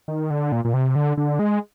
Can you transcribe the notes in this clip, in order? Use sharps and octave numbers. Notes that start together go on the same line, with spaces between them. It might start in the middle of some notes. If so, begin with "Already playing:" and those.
D#3
D3
A#2
A#2
C3
D3
D3
G#3